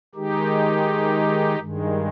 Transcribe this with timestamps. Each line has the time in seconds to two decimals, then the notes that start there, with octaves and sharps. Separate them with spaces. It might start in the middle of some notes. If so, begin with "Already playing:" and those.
0.15 D#3 G#3 D#4 G4
1.60 G2 D#3 G#3